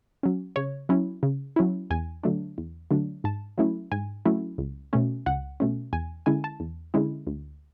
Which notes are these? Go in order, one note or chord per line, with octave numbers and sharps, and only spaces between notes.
F#3 C#4
C#3 C#5
F#3 C#4 E4
C#3
F#3 C#4 E4
E2 G#5
D3 F#3 A3 D4
E2
D3 F#3 A3 D4
G#2 A5
F#3 A3 C#4 E4
G#2 G#5
F#3 A3 C#4 E4
C#2
B2 A3 C#4
C#2 F#5
B2 A3 C#4
E2 G#5
D3 G#3 C#4 E4 G#5
A5
E2
D3 G#3 C#4 E4
D2